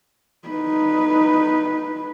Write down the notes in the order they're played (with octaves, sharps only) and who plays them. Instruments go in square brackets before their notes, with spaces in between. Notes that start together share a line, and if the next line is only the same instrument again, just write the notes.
[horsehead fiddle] D#4 B4